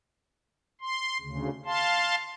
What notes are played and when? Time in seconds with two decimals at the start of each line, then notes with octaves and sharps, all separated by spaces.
0.81 C6
1.21 D2 C#3
1.65 F5 A5 C6